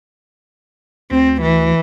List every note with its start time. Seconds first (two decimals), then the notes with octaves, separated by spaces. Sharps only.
1.11 D2 C4
1.41 E3